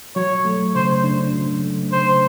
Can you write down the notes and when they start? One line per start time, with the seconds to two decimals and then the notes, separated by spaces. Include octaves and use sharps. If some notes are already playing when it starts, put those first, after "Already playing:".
0.16 F#3 C#5
0.45 A3
0.75 C#3 C5
1.04 D4
1.33 F#3
1.62 A3
1.92 C#3 C5